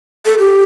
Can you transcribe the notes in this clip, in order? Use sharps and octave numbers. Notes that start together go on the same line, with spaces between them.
A4
G4